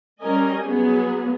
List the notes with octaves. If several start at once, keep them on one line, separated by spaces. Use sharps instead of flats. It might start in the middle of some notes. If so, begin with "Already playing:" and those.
G3 C#4 A#4 D#5 G#5
F#3 B3 G#4